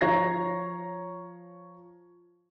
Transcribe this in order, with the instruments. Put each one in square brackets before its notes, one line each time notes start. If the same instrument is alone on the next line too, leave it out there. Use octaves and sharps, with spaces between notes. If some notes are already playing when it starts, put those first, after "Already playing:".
[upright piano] F3 C#5 A#5 G#6 A#6 C7